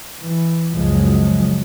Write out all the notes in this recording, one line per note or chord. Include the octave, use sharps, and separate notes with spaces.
E3
F#1 C#2 F3 F#3 G#3